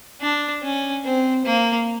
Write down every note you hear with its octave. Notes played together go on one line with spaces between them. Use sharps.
D4
C#4
C4
A#3